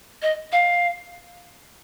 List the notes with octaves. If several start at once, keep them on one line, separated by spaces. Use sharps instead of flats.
D#5
F5